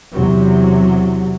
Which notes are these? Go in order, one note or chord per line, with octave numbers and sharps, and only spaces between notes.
E2 C3 F#3